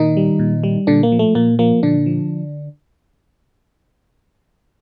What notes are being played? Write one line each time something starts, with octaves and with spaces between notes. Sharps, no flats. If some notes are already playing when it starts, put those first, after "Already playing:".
Already playing: A#2 D#3 D#4
G3
A#2
G3
A#2 D3 D4
A#3
F3
A3
A#2 A#3
F3 A#3
A#2 D3 D4
F3